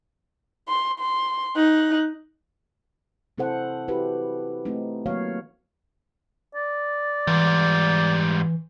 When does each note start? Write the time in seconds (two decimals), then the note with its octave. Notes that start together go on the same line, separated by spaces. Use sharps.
0.68 C6
1.00 C6
1.56 D#4 F#6
3.38 C3 C4 E4 A4 C5 F#5
3.88 E4 F#4 G4 B4
4.65 A3 C4 D#4
5.06 D#3 F#3 A#3 F#4 C#5 F5
6.55 D5
7.27 G#2 E3 G3